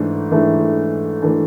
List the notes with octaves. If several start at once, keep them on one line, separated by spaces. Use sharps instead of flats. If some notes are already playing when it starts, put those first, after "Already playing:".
Already playing: G#2 E3 A3 D4
G#2 E3 A3 D4
E3 A3 D4